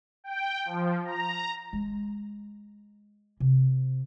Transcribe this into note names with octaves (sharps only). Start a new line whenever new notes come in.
G5
F3
A#5
G#3
C3